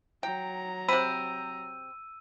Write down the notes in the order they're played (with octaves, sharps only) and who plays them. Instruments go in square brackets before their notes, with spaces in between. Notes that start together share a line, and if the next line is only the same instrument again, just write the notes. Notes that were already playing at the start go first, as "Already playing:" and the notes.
[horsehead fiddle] F#3 A#5 [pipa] G5
[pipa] C3 C4 [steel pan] B5 [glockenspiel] E6 D#7